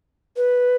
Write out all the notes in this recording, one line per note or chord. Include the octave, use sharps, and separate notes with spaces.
B4